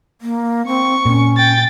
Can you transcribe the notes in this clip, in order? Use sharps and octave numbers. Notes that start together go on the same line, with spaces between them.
A#3
C4 C#6
A#2 C#4
G5 A6